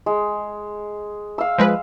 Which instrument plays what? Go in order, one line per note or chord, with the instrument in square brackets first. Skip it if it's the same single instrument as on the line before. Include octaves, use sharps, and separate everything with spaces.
[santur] G#3
F5 E6
[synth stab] F3 G#3 B4